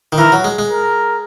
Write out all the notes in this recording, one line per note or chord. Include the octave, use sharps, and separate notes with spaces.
D#3
E3 A#4
F#3
G#3
G#3
A#4